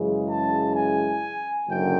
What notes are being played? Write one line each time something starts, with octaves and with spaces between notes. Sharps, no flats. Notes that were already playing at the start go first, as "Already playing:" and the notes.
Already playing: F#2 C#3 E3 G#3
A5
G#5
F#1 F#2 D3 G5